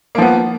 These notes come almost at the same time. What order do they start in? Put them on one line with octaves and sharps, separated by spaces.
A#3 F3 B3